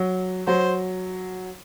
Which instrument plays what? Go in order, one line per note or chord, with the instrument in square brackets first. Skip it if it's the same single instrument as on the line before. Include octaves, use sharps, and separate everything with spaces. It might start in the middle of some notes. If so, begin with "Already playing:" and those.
Already playing: [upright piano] F#3
[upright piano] F#3 [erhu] C5